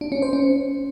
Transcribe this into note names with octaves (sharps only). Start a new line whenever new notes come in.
D4
C#4
C5
C#4